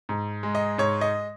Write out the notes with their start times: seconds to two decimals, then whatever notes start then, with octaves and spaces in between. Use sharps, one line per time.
0.09 G#2
0.43 G#3
0.55 D#5
0.78 G#2 C#5
1.01 D#5